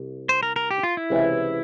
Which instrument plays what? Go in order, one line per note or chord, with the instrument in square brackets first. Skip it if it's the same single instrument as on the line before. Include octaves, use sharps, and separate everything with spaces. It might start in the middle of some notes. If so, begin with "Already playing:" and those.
Already playing: [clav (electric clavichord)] C2 C3
[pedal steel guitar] C5
A#4
A#4
G4
F4
E4
[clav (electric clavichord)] C#2 C3 E3